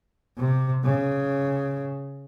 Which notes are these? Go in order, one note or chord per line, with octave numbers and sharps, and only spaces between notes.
C3
C#3